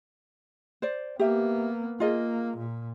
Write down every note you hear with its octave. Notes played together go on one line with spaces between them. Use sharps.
C5 D5
A#3 B3 G4 E5
A#3 F4 G#4 D#5
A#2